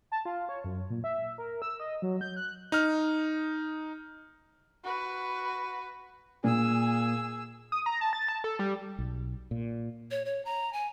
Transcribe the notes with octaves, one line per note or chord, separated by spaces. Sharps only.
A5
F4
C#5
F#2
A#2
E5
A#4
E6
D#5
F#3
G6
F#6
D#4 F6
F#4 B4
A#2 G#4 E6
D#6
A#5
A5
A6
A5
A4
G3
B1
A#2
C#5
C#5
A#5
G#5